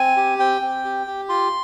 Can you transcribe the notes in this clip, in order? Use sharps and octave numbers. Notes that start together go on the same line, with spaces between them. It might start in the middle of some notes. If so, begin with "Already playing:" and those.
Already playing: C4 G#5
G4
C4 G5
C4
G4
G4
F4 C6